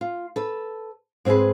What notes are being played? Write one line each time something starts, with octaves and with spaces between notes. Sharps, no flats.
F4
A4 B4
G#2 C4 E4 G#4 B4